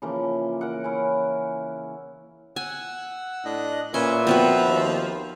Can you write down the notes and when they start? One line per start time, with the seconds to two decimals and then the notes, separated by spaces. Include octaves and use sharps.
0.02 C#3 E3 F3 A#3
0.61 A#4 F#5
0.84 C#4 E4
2.56 F#5 G#5 E6
3.45 A2 D4 D#5 F#6
3.94 A#2 C#4 B4 E5 C6
4.27 F3 B3 C4 F#4
4.62 D#2